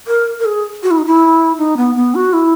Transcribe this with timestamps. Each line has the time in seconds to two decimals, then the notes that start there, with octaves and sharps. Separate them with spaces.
0.08 A#4
0.40 A#4
0.45 G#4
0.83 F#4
0.91 E4
0.98 D#4
1.06 E4
1.58 D#4
1.77 B3
1.95 B3
2.15 F#4
2.33 E4